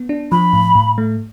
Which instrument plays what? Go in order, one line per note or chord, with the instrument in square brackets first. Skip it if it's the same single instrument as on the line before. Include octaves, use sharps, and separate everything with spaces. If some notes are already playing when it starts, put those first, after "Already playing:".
Already playing: [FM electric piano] B3
D4
[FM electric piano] F3 [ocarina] B5
[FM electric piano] A2
A2
A3